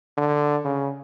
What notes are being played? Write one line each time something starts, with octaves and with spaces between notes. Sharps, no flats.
D3
C#3